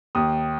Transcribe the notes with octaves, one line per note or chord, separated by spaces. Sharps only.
D#2 D#6